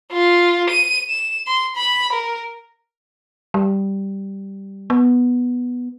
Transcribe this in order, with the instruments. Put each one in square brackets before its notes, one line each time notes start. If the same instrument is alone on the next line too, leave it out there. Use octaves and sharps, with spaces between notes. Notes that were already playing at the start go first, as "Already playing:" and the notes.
[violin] F4
D#7
E7
C6
B5
A#4
[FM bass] G3
B3